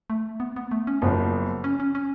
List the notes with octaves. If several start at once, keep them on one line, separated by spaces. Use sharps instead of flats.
A3
B3
B3
A3
C#4
F#1 F#2 F3 B3
C#4
C#4
C#4